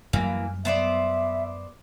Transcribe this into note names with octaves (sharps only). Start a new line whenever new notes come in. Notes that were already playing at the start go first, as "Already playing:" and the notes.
F#2 E3 F#3 G3 A#3
B3 C5 D5 E5